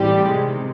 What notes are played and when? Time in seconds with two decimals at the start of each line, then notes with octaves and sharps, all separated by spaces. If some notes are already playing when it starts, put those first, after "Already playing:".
Already playing: A2 E3 G3 C4 G4
0.26 C3 D#3 G#3